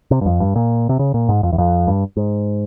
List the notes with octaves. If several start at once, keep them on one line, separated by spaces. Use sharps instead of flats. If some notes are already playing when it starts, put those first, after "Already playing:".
C3
G2
F2
G2
A#2
C3
C#3
A#2
G#2
F2
E2
F2
G2
G#2